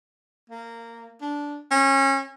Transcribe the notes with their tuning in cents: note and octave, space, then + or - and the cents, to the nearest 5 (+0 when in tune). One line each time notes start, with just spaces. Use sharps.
A#3 -15
D4 -10
C#4 -30